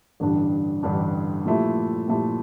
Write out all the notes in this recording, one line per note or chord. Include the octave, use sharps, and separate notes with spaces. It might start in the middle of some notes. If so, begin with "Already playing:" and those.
A1 G2 D3 G3 D4
A1 G2 D3 G3 D4
A#2 F3 A3 E4 G4
A#2 F3 A3 E4 G4